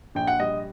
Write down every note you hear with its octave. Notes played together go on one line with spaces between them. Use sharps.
A#1 G5
F#5
G3 D#5